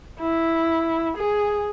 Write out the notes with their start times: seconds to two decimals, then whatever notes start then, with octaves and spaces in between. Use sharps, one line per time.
0.20 E4
1.17 G#4